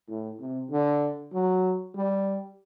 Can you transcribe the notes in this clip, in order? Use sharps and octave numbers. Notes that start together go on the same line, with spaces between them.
A2
C3
D3
F#3
G3